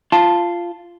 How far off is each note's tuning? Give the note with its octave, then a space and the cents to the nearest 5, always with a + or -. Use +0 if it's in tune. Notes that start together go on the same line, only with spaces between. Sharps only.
F4 -10 A5 +0